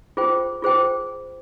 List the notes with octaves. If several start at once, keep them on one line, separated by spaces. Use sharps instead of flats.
F4 G#4 C5 G5
F4 G#4 C5 G5